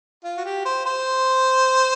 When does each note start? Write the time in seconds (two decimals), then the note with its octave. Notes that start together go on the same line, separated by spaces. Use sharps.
0.24 F4
0.37 F#4
0.45 G4
0.65 C5
0.86 C5